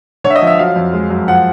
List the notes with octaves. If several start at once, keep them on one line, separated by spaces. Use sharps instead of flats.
D3 C#5
E5
D#5
F3
E5
F#3 F5
F2
G#3
F#2
F3 F#5